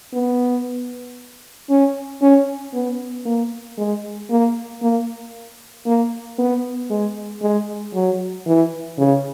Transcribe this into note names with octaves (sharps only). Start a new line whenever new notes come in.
B3
C#4
C#4
B3
A#3
G#3
A#3
A#3
A#3
B3
G#3
G#3
F#3
E3
C#3